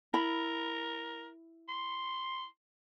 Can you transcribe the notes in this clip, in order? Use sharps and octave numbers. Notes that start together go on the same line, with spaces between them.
E4 A#4 B5
C6